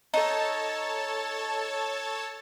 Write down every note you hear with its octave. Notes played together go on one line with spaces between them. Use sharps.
D#4 A4 C#5 A5